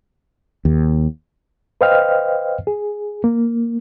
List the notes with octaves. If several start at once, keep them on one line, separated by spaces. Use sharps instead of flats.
D#2
B4 C5 D#5 F5 G5 F6
G#4
A#3